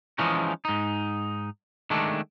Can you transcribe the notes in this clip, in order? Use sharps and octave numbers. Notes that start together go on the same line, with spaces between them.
E3 F3 G#3 C#4 D#4
G#2 D#4
D#3 G#3 A3 D4